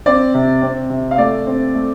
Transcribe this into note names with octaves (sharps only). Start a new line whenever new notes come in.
C4 D5
C3
C4
C3
F5
A3 D5
C4
A3